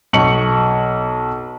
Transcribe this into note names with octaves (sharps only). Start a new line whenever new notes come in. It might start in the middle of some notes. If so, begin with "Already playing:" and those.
B1 C#6 C#7 F#7